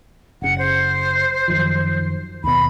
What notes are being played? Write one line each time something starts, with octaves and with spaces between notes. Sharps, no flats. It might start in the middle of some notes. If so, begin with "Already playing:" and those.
F#1 C#3 F#5
C5
F#2 D#3 F3
D#2 B2 B5